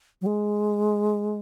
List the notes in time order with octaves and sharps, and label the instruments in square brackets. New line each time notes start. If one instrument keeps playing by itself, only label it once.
[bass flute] F#3
G#3